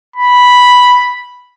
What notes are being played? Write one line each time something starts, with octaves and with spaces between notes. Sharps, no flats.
B5